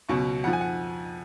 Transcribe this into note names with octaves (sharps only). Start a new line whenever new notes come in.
C#2 B2 F#3 C#6
F2 F3 F#5
G#5
F#5